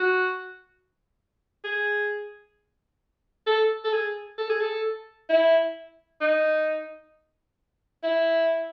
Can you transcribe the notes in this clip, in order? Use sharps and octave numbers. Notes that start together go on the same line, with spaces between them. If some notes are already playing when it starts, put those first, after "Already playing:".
Already playing: F#4
G#4
A4
A4
G#4
A4
G#4
A4
E4
D#4
E4